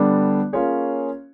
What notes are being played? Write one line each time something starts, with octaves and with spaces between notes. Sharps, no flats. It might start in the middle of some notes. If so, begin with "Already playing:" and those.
Already playing: D3 G3 B3 D4
A#3 C#4 F4 G#4 C#5